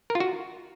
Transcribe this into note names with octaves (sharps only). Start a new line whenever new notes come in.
A#4
F4
F#4